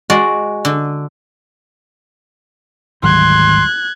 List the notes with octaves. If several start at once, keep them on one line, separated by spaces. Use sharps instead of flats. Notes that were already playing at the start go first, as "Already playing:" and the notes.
G#3 F#4 D5
D3
G#1 D2 F#3 G3 C6 F#6 G#6